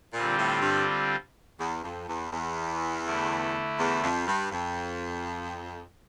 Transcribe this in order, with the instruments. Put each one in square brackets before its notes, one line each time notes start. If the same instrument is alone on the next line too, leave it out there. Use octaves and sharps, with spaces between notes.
[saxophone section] A#2 [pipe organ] D3 G3 C4 F4
[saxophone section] A2
G2
E2
F2
E2
E2
[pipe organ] D3 A3 E4
[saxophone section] E2
F2
G2
F2